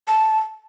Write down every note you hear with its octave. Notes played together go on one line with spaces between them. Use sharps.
A5